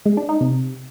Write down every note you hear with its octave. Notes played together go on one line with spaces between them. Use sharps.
G#3
D4
D#4
C3